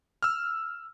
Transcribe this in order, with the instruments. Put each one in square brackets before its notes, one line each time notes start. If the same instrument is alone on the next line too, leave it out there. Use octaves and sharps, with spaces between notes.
[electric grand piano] E6 F6